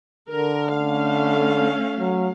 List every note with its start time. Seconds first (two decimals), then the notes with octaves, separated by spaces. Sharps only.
0.30 D3 A#4
0.74 A3 C#4 F5
1.99 F#3